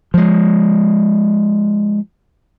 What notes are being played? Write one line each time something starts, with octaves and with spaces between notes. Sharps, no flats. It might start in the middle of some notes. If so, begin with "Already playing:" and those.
F3 G#3